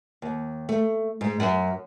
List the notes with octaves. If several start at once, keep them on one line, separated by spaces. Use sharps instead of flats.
D#2
A3
G#2
F#2